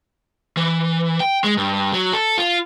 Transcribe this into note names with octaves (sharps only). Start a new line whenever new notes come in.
E3
G5
G#3
G2
F#3
A4
F4